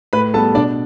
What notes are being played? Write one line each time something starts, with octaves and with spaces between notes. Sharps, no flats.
A2 B4 B5
G3 B3 A4 A5
B2 D4 D5